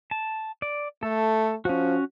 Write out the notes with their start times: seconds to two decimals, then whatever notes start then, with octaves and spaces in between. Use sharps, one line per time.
0.11 A5
0.62 D5
1.03 A3 A4
1.65 F3 C#4 F#4